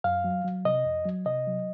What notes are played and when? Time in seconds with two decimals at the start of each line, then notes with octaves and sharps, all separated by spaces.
0.04 F#2 F5
0.24 F#3
0.44 F#3
0.65 C3 D#5
0.85 F2
1.06 F#3
1.26 C3 D#5
1.47 F#3